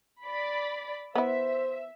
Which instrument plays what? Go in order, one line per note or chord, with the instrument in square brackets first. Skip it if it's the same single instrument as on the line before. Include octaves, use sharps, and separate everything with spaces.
[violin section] D5 B5
[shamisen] B3 E4 [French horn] C5 [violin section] E5